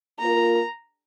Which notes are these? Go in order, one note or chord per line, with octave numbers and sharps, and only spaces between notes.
A#3 F4 A#4 A#5